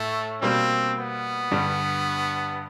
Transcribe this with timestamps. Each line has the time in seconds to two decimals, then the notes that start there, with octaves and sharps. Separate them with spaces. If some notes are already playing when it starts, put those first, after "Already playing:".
Already playing: A2 A3
0.42 B2 G3 A#3 C4
0.97 B3
1.51 G2 D3 G3